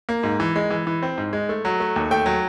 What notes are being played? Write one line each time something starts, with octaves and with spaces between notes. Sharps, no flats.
A#3
G#2
E3
G#3
E3
E3
C4
G#2
G#3
A3
F#3
A3
D#2
A3 G5
F#3